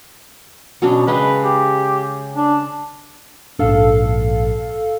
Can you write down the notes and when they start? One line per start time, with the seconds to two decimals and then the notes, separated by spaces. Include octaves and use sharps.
0.82 B2 F#3 C#4 D4
1.07 C#3 G#3 B4 G5
1.44 G4
2.36 D4
3.59 A#1 G#2 D4 A4 F5